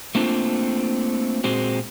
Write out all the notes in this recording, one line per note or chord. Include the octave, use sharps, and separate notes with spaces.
A3 A#3 C4 D4 F4
A#2 G#3 C4 F#4